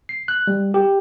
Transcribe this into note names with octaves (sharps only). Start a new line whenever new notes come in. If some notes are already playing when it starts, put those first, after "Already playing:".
C7
F#6
G3
G4